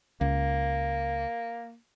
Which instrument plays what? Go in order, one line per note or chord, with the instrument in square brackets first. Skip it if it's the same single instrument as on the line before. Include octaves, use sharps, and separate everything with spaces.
[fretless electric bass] C#2 [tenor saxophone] A#3